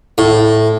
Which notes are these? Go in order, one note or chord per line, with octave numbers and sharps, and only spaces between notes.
A2